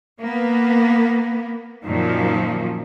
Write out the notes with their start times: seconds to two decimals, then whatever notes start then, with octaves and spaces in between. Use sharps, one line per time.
0.19 A#3 B3
1.84 F#2 A#2 D#3 F3